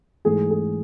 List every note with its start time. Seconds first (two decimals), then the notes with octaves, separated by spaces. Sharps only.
0.25 G#2 E3 A3 G#4
0.51 G#4